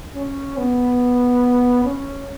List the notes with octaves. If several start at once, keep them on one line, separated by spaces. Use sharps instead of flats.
C#4
B3
C#4